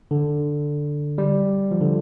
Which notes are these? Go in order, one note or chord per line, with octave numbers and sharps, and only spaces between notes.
D3
G3
F3
D3